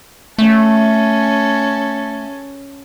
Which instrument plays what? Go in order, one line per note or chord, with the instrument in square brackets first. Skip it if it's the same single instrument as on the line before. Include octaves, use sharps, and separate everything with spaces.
[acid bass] A3 [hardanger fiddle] C#4 A4